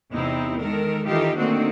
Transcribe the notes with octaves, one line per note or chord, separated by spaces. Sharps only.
E2 C3 C4 D#4 E4
D#3 G#3 A4 A#4
D#3 E3 D#4 F4 G4 A4
D3 D#3 A3 A#3 C4 F#4